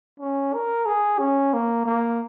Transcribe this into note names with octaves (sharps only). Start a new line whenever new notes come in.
C#4
A#4
G#4
C#4
A#3
A#3